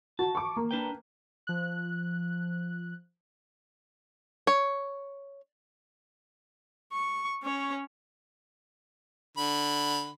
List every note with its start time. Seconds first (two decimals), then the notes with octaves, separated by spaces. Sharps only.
0.19 F#4 A5
0.35 C#6 D6
0.57 A#3
0.71 D4 B4 G5
1.47 F3 F#6
4.47 C#5
6.93 C#6
7.43 C#4 C#5
9.37 D3 B5